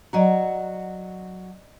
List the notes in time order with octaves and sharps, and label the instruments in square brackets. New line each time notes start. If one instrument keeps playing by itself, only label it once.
[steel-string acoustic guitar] F#3 F#4 [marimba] D5 D#5 A#5